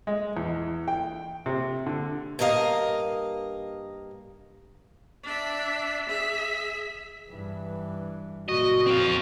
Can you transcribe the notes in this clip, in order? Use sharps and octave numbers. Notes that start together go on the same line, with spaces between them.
G#3
E2
G5
C3
D3
G2 A#3 A#4 D#5 F5
D4 E5
G#4 E5
G2 E3
F#1 A#2 F#4 D#5
C4 F5